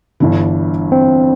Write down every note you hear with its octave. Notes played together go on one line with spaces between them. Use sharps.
G1 G2 E3
C4